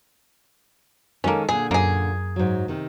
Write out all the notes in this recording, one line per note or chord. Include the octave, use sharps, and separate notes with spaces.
D#3 G#3 A#3 C#4 A4
A#2 D3 G#4
F#2 A#3 G#4
G#2 F#3
C3 D#3